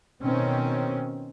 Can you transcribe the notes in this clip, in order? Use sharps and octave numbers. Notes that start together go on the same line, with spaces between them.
B2 D#3 C4 C#4